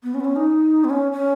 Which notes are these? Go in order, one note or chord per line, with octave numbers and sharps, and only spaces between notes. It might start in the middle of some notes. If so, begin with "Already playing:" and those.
B3
C#4
B3
C#4
D#4
B3
C#4
C#4